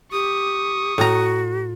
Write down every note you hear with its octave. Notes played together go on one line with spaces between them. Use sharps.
G4 C#6 D#6
A2 F#4 A#5